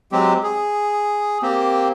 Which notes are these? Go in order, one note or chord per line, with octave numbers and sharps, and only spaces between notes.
F#3 G#3 C4 G4
G#4
A#3 C4 G4